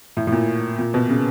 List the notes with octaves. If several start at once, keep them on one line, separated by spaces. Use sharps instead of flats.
A2
A2
A#2
A#2
B2
C#3